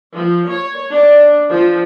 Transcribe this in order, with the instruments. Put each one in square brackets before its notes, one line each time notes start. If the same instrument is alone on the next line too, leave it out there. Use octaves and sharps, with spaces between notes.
[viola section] F3
C#5
D4
F3